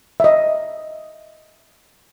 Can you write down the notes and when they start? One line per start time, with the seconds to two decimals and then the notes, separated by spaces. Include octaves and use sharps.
0.20 D#5 E5